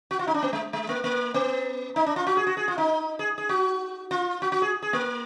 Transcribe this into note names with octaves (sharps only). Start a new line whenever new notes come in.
F#4
F4
D#4
D4
B3
G#3
G#3
A#3
A#3
B3
D#4
D4
F4
F#4
G#4
F#4
G#4
F4
D#4
G#4
G#4
F#4
F4
F#4
F#4
G#4
G#4
A#3